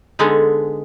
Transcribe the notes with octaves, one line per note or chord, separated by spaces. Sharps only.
D3 G#3 B3 D#4 G#4 A4